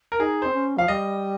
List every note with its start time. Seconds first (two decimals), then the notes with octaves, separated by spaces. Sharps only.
0.12 A#4
0.19 D#4 G#4
0.42 C4 C5
0.54 C#4
0.77 F3 F5
0.88 G3 D#5